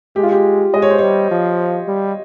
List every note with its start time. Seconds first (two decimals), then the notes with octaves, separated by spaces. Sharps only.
0.16 G#3 G4
0.23 F4
0.32 G4
0.73 G#3 D#5
0.82 C#5
0.90 C5
0.98 G3 C#5
1.31 F3
1.88 G3